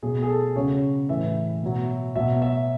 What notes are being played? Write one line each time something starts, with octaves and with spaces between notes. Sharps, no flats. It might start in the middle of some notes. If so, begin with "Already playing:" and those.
B2 F#3 G#4
G#4
A4
C#3 F#3 C#5
A2 E3 E5
B2 F#3
B2 F#3 E5
E5